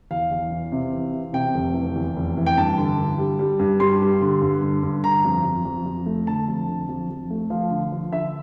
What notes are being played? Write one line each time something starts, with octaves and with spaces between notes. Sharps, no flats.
E2 F5
E2
E3
C3
E3
E3
C3 G5
F1
E3
E2
F1
E3
G5
G2 A5
D3
D3
G3
G3
G2
G3 C6
G3
D3
G2
D3
G2
D3 A#5
F2
F2
F2
F2
A3
D3 A5
F2
D3
F2
F2
A3
F3 F5
D3
F3
D3 E5